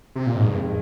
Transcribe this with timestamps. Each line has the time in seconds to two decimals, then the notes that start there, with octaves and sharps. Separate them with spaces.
0.15 C3
0.27 A#2
0.32 F2 G#2 D#3 G#3
0.46 G2